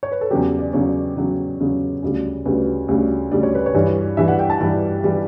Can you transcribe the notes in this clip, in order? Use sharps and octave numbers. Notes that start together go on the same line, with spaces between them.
C#5
B4
A4
E2 C#3 F#3 G4
D5
E2 C#3 F#3 C#5
E2 C#3 F#3
E2 C#3 F#3
D2 C#3 G3
D2 C#3 G3 B4
D2 C#3 G3
D2 C#3 G3 D5
C#5
B4
C#5
G2 E3 G3
G2 E3 G3 E5
F#5
G5
A5
G2 E3 G3
E3 G3